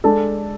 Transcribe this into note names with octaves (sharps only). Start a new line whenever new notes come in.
G#3 D4 A4